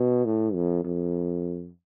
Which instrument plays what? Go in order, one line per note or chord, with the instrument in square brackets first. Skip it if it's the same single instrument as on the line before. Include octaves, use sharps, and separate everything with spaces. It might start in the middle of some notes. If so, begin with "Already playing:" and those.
Already playing: [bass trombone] B2
A2
F2
F2